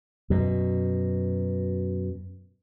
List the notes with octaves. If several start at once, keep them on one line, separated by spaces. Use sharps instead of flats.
F#2 B2